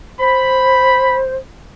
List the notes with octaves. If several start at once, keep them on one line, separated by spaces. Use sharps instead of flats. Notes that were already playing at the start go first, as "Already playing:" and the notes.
C5 B5